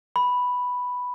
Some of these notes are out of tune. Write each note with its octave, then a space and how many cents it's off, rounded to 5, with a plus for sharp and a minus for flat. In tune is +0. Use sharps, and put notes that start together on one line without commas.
B5 +0